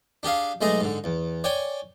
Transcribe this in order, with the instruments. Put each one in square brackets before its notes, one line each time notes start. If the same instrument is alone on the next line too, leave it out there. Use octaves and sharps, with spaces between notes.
[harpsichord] D4 G4 G#4 F5
B1 G#3 A3 G#4 D#5 A#5
G#2 D3
E2
C#5 D5 G5 G#5